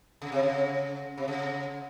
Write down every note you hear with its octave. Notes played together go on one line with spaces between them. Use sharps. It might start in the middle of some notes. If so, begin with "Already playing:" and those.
C#3
C3
C#3
C3
C#3